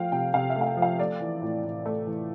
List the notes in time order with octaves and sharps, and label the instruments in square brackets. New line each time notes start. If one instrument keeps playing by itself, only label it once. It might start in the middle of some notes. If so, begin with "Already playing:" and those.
Already playing: [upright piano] F3 A3 F5 G5
C3 G5
C3 F5
E5
A3 F5
G5
F3
F5
A3 D5
E3
A2
A2
A3
E3